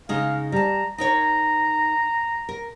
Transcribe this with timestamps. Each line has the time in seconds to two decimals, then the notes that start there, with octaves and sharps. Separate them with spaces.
0.09 C#3 G#3 D#4 F5
0.52 G3 A5 A#5
0.98 D#4 A#4 C#5 A#5
2.49 A#4